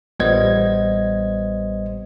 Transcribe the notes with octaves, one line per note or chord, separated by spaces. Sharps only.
A1 G3 B3 C5 D#5 G#6